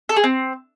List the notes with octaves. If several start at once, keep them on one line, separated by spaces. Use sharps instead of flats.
A4
G#4
C4